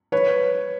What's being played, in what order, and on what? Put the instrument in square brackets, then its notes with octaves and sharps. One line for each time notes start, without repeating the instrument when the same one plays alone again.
[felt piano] B4 C#5